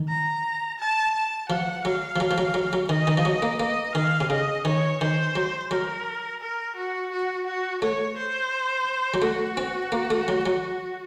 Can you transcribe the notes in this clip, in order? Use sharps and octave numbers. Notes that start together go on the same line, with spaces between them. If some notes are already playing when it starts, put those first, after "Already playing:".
Already playing: D#3
A#5
A5
A5
F3 F#5
F#3 F5
F3
F#3
F3
F#3
F#3
F#3
D#3 D#5
D#3
F3
F#3
A#3
A#3 D#5
D#3 F5
C3
C#3 D#5
D#3 C#5
D#3 C5
F#3
F#3 A#4
A#4
F#4
F#4
F#4
A3 C#5
C5
F#3
A3 F#4
C4
A#3
A3
F#3
F#3